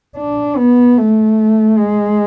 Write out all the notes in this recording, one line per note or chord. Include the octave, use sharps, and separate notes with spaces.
D4
B3
A3
G#3